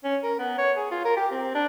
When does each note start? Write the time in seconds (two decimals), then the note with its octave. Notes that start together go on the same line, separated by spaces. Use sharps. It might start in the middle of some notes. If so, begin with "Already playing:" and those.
0.04 C#4
0.23 A#4
0.39 B3
0.58 C#5
0.76 G#4
0.91 F4
1.05 A#4
1.17 G4
1.31 C4
1.54 D4